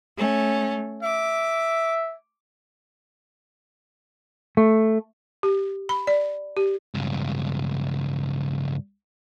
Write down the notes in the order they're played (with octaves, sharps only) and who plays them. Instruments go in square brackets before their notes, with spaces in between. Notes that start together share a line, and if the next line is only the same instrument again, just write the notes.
[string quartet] A3 C#4
[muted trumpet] E5 [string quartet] D6
[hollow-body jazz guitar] A3
[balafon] G4
B5
D5
G4
[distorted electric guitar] C#2 G2